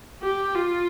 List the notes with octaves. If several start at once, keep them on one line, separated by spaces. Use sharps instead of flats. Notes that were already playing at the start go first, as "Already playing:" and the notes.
G4
F4